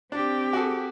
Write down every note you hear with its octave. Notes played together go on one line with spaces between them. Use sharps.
C4 D4 G4
F#4 G#4 A4